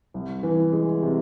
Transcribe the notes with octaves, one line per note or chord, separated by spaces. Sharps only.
C2
E3
G#3
C3